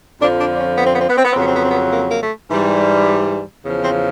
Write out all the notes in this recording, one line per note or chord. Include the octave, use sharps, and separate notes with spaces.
F2 D3 F3 D4
D4
D4
C#4
B3
C4
B3
C4
B3
C4
B3
C4
F2 C#3 F#3 B3
C4
B3
C4
B3
A#3
A#3
A3
G#2 E3 G3
E2 C#3 F3
C4